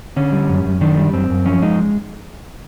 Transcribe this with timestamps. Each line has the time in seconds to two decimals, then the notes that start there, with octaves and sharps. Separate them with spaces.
0.16 D3 C#4
0.32 G3
0.49 F#2
0.65 F#2
0.81 D#3 D4
0.97 G3
1.13 F#2 C4
1.30 F#2
1.46 F3 C#4
1.62 G#3 D#4